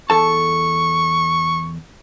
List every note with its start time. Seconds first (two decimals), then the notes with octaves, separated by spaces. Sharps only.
0.10 E2 A4 A5 C#6